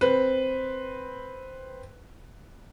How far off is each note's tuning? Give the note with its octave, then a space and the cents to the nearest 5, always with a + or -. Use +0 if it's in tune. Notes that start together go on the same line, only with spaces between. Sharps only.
C4 +0 B4 +0